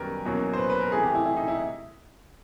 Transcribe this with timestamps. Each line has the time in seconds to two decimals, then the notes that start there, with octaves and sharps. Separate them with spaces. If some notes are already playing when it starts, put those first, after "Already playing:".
Already playing: F#2 D#3 G3 B3 A#4 B4
0.25 E2 B2 F#3 A#3 C#4
0.53 C5
0.58 B4
0.70 B4
0.81 A#4
0.92 C3 E3 A3 G#4
1.03 G4
1.15 E4
1.25 E4
1.37 D#4
1.48 E4